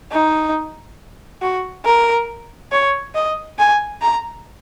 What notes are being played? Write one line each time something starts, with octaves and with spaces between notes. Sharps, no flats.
D#4
F#4
A#4
C#5
D#5
G#5
A#5